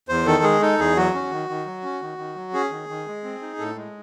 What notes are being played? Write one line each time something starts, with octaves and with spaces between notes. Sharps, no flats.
E2 C5
D#3 A4
G#3 G#4
D#4 A4
E2 G#4
F#3 F#4
C#4
D#3
D#3
F#3
C#4
D#3
D#3
F#3
C#4 G#4
D#3
D#3
G#3
C4
D#4
A2 A4
G#3